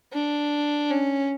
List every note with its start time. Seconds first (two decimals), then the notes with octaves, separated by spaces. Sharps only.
0.13 D4
0.91 C#4